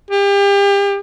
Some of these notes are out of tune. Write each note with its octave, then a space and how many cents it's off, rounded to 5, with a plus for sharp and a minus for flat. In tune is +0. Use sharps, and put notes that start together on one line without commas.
G4 +35